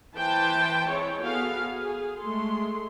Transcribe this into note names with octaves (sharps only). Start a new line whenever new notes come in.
E3 B4 C5 G5 A5
G#3 C4 E4 C#5
B3 F#4 G#4 A4 F5
G#4
G#3 A3 A4 C6